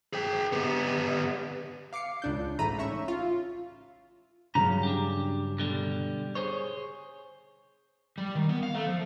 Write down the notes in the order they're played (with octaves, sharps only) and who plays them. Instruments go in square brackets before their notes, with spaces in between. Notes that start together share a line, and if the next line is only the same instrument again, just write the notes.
[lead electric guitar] G#4 G5
B3 G4
[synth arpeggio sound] F5 D6 C7 C#7
C#2 D4 G6
A1 G#2 A3 A#5 B5 D#7
C#4 E5 C#6
F4
[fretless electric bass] G2 C#3 F#3 [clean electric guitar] C#4 A#5
[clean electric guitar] D4 G4
B2 D3 G3
G#4 C5 C#5
[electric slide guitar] G3
D#3
B3
F5
A3
F3